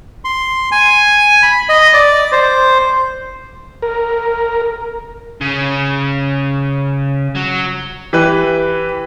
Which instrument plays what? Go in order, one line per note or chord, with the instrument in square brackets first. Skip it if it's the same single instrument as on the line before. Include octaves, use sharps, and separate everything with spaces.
[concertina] C6
G#5
B5
D#5
D5
C5
[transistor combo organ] A#4
[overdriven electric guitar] C#3
F#3
[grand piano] E3 G4 B4